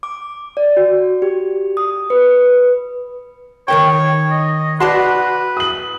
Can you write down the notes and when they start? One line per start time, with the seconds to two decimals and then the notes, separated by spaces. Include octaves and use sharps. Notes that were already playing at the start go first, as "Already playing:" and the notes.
0.03 D6
0.57 D5
0.77 F#4
1.22 G4
1.77 D#6
2.10 B4
3.68 D#3 A#4 C#5 G5
4.31 D#5
4.80 F#4 B4 D5 A5 C6
5.57 D#6 F#7